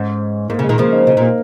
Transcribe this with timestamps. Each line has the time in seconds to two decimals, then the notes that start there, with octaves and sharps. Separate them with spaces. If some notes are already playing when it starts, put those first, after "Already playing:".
Already playing: G#2 C#4
0.50 G#2 A#3
0.59 C#3
0.64 G#3
0.69 A#2 D#3
0.78 C#3 F3 A#3
0.92 D#4
1.07 C#3 D#4
1.17 A#2 A#3